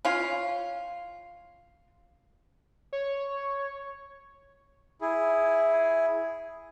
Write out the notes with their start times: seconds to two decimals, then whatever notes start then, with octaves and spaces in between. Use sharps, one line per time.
0.05 C#4 F4
2.93 C#5
5.01 E4 G#4